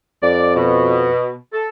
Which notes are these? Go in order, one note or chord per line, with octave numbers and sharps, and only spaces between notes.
F2 D5
B2
A4